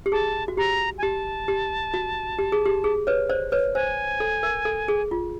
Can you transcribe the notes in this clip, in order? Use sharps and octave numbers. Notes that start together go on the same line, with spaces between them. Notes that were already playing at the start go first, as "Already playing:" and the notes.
G4
G#4 A5
F#4
G4 A#5
G#5
G4 A5
G4
F#4
G4
G#4
G4
G#4
B4 C#5
C5 D5
B4 C#5
C5 G#5
A4
A#4
A4
G#4
F4